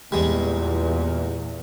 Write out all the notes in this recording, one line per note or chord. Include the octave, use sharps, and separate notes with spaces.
E2 A#2 G3 G#3